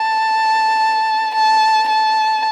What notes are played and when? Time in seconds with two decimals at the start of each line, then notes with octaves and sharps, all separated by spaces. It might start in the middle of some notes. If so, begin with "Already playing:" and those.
Already playing: A5
1.34 A5
1.88 A5